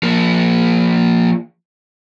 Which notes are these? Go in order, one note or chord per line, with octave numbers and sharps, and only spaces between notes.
F3 A#3